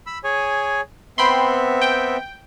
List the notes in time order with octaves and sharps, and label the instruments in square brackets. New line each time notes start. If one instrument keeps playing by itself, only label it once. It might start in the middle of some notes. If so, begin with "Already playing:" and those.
[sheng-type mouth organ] B5 E6
G#4 C#5 G#5
[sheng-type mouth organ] B3 C4 E5 [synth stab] G5 B5 C6
[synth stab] G5